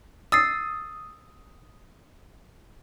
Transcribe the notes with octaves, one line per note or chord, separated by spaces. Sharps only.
D#6 E6 A6 C7